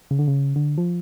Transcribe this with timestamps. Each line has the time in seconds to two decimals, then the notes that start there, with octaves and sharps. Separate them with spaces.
0.11 C#3
0.19 D3
0.28 C#3
0.56 D3
0.78 F3